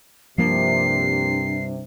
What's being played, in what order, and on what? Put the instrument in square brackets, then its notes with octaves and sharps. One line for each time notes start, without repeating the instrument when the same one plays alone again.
[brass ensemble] C2 G2 C3 [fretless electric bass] F3 A#3 [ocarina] D4 [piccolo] C7